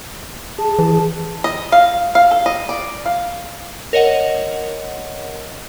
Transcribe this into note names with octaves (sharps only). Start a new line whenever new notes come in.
G#4 A5
E3
D#5
F5
F5
A4
D#5
D5
F5
A#4 C#5 D#5 F#5